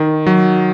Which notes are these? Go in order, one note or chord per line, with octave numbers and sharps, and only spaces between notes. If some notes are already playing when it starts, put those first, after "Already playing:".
Already playing: D#3
F#3